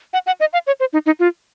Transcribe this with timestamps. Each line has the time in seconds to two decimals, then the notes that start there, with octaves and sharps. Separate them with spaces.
0.13 F#5
0.27 F#5
0.40 D#5
0.53 F5
0.67 C#5
0.80 C5
0.93 D#4
1.06 D#4
1.20 F4